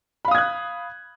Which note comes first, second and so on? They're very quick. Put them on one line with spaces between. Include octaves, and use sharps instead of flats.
B5 F5 D#6 G#6 F#6